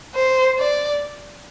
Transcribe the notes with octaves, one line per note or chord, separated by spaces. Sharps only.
C5
D5